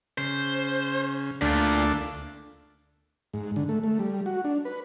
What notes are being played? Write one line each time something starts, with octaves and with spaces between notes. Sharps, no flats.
C#3 C5
D2 A#2 A3 D4 F4
G#2
D3
A3
A3
G3
F#4
D4
B4